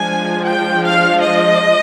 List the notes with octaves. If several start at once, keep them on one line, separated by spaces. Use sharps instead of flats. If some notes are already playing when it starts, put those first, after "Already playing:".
Already playing: F3 G#3 D4 G#5
G5
F5
D#5